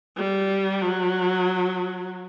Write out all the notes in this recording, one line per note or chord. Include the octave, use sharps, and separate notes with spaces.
G3
F#3